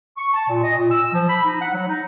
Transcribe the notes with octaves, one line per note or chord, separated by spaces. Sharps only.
C#6
A5
A#2
D#5
A#2
E6
F3
B5
D#4
F#5
F#3
D#4